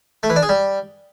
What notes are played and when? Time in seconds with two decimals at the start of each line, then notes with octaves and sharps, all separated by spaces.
0.23 A3
0.30 E3
0.36 D4
0.43 G#4
0.49 G3